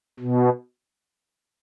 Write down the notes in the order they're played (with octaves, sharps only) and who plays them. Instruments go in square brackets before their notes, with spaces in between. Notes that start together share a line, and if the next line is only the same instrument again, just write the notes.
[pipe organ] B2